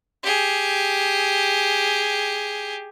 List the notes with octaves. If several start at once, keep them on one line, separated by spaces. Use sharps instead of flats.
G4 G#4